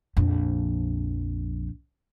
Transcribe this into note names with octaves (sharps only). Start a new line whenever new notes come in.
A#1 F2